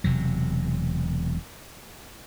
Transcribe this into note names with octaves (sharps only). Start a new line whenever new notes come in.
E1 C3 F#3